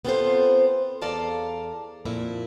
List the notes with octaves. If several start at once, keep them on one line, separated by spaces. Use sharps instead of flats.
B3 C4 F4 F#4 A4 C5
E2 A4 D5 F5 A5 A#5
F2 A#2 E4